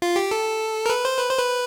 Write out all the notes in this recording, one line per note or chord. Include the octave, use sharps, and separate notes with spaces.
F4
G4
A4
A#4
B4
C5
B4
C5
B4